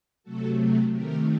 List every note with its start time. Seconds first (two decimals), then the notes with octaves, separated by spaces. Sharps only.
0.23 C3 F#3 A3 F#4 A4
0.91 C3 D#3 A3 G4 A#4